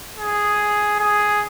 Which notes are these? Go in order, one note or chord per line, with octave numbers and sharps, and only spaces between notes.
G#4
G#4